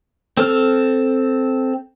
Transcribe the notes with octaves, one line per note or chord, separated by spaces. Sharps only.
C4 A4 F6